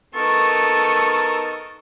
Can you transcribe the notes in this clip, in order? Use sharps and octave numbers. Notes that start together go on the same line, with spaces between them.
B3 D#4 A4 A#4 C#6